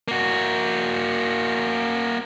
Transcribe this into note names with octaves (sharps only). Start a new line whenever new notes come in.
A#3 F#4